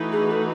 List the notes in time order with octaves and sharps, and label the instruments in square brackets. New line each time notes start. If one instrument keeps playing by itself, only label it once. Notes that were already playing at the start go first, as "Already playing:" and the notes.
Already playing: [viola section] E3 A3 D#4 F#4 B4
[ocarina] G#4
A4